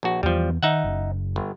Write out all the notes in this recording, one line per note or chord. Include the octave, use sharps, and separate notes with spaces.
A#1 F#4
E2 E3 F3 G3 B3
D#3 D#4 E5 F#5
F#1
G1